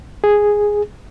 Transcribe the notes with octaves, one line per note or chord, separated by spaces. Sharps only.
G#4